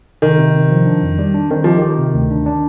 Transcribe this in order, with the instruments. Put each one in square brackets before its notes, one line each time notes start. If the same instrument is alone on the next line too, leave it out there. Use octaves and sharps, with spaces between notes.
[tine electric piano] C3 [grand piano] D#3
[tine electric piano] C3
C3
F3
D4
F2
G3
D4
[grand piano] D#3 [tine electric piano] C4
[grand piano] F3 [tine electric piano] G4
[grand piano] D#3 [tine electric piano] G4
[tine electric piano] C3
D2
D4
D4